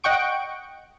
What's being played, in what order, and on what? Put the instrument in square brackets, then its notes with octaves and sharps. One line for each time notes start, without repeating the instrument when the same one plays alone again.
[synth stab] D#5 F#5 G5 C#6 D7